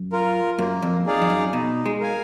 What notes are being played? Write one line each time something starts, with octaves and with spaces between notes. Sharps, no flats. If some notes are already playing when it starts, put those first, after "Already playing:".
Already playing: F#2
F4 A#4
F#2 A#3
F2
D#4 G#4 D5 F5
F2
F#2
B2 D#4
G#3
A#4 F5 G#5